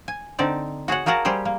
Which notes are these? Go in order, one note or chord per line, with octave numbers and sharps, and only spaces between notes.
G#5
D3 C4 D#4 D5
F#4 G#4 C#5 F#5
A#3 F#4 G#4 A#4 F#5 A5
G3 G4 G#4 C5
A#3